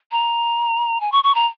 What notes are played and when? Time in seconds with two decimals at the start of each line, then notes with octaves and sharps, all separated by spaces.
0.12 A#5
1.00 G#5
1.12 C#6
1.24 C#6
1.35 A#5